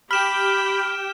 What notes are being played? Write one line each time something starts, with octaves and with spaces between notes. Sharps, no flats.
G4 G5 B5 F6 E7